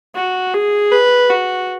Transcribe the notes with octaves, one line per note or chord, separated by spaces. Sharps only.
F#4
G#4
B4
F#4